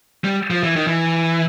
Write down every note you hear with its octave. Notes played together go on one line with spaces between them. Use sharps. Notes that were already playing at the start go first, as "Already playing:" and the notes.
G3
F3
E3
D#3
E3